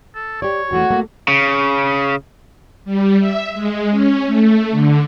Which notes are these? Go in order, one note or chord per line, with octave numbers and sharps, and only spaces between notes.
A4
G4 C#5 D5
E2 E3 A3 F#4
A3 A#3
C#3
G3
E5
G#3
C#4
A3
D3